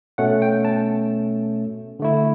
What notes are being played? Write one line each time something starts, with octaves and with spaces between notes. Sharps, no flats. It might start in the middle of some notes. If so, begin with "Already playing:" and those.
B2 A3 C#4 F#5
G5
A5
D3 A3 E4